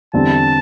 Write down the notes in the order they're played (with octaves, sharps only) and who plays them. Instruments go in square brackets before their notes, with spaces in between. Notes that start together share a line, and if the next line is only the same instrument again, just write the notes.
[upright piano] E2 D3 G3 C4 [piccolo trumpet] A5